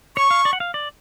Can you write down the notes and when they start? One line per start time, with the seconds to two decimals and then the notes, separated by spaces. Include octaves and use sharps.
0.16 C#5 C#6
0.31 F5
0.45 D5
0.53 F#5
0.60 F5
0.74 D5